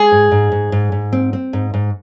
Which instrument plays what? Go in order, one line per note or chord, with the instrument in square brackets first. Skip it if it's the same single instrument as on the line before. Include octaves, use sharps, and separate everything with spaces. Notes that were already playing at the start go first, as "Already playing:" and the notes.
Already playing: [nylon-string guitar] G#3 [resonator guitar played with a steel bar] G#4
[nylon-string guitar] G#2
G#2
G#2
G#2
G#2
C4
C4
G#2
G#2